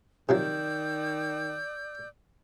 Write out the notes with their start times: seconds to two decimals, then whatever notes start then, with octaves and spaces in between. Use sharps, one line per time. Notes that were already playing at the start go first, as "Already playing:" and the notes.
0.29 C3 D#3 F3 F#3 D5 E6 G6